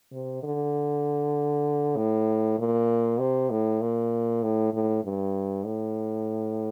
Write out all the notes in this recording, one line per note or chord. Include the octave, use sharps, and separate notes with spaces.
C3
D3
A2
A#2
C3
A2
A#2
A2
A2
G2
A2